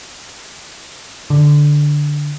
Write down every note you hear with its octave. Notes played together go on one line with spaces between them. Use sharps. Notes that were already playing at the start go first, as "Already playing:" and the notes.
D3